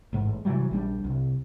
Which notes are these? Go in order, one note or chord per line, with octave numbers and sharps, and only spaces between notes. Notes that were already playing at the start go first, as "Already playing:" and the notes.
A1 G#2
C3 E3 F#3 G3
A#1 G3 D4
C2